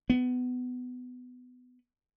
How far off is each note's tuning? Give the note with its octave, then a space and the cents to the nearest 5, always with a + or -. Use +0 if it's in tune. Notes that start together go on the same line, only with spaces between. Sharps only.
B3 +20